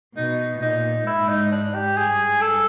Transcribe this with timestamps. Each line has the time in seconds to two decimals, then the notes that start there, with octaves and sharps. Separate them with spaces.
0.17 B2 D#4
0.62 A#2 D#4
1.07 G#2 E4
1.29 D#4
1.52 D4
1.75 G4
1.96 G2 G#4
2.41 A4